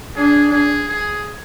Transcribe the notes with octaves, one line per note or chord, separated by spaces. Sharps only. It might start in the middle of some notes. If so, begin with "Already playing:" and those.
D4 G#4
G#4
G#4